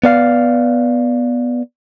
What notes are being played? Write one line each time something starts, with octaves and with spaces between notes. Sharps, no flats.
B3 D5 F5